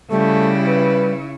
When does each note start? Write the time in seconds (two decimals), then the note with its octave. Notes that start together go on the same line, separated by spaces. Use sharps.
0.11 C#3 G3 A3 E4
0.67 B4